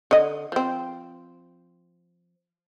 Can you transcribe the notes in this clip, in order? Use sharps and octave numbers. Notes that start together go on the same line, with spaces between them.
D3 D#5
F3 C4